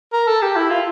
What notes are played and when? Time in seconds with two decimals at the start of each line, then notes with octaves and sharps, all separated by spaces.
0.13 A#4
0.27 A4
0.42 G4
0.56 E4
0.70 F4